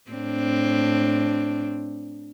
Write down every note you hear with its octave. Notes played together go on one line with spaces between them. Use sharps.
A2 C4 D4